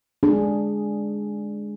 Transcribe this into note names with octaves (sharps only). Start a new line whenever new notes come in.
G#3 D4 G#4